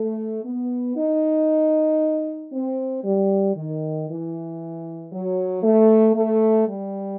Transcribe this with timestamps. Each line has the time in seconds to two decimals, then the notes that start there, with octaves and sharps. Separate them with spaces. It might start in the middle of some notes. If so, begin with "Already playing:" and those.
Already playing: A3
0.45 B3
0.96 D#4
2.51 C4
3.04 G3
3.56 D#3
4.08 E3
5.11 F#3
5.63 A3
6.15 A3
6.67 G3